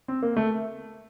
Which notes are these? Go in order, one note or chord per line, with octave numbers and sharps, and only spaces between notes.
C4
A#3
A3